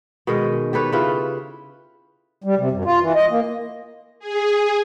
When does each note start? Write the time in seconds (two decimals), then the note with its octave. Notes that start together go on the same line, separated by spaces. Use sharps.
0.27 B2 D#3 G#3 D#5
0.73 G4 A4 B4 C#5
0.92 C#3 E4 F4 B4
2.44 G3
2.58 C3
2.71 F#2
2.85 F4
3.01 E3
3.15 D#5
3.30 A#3
4.19 G#4